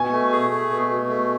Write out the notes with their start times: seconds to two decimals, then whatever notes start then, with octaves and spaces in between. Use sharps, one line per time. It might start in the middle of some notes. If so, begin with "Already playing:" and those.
Already playing: B2 G#5
0.12 A3
0.32 G#4
0.51 A3
0.70 B2
0.89 B2
1.09 A3